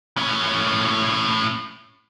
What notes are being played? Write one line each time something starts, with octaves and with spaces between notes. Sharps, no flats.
A2 C#4